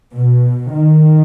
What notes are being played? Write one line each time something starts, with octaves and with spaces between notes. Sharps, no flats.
B2
D#3